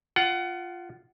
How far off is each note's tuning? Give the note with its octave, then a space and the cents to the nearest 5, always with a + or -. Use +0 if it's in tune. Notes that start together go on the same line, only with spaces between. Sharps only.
F4 +0 F#5 +25